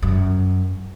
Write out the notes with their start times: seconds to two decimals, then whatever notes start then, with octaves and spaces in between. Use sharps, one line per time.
0.02 F#2